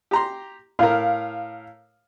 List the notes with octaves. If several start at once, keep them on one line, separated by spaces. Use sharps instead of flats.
G4 A#5 C6
A2 A#4 F5